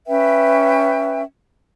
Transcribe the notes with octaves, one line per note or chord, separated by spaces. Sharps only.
C#4 B4 E5 G5